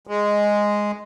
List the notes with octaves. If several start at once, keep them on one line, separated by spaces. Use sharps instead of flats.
G#3